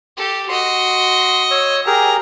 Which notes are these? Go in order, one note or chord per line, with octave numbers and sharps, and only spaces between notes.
G4 A4
F#4 D#5 C6
C#5 E6
G4 G#4 A#4 A#5